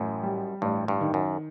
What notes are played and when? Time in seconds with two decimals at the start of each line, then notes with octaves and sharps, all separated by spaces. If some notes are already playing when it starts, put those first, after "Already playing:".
Already playing: A1 F#2
0.23 G3
0.62 A1 G2
0.88 G2
1.01 D#3
1.14 F#2